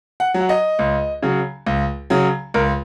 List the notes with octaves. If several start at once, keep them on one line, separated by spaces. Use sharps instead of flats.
F#5
F#3
F#5
D#5
C#2
C#3 F#3
C#2
C#3 F#3
C#2 A#4